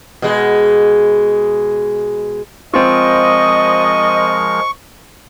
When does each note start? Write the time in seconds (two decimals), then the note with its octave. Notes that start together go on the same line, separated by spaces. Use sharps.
0.22 B2 G#3
2.74 F3 G#3 C4 F4 A#4 D#5 C#6